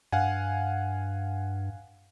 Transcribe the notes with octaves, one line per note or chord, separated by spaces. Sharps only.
G2 F5 F#5 G#5